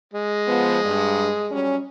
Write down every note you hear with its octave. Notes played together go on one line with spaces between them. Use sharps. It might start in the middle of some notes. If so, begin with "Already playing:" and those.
G#3
F3 B3
G2
F#3 G3 C#4